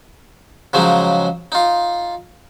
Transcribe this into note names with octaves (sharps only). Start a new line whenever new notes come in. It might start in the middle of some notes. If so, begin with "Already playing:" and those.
C#3 F3 F#3 G#3 D#4
D#4 F4